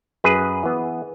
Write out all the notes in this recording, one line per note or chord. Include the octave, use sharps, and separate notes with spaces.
F#2 G#4 B4
E3 B3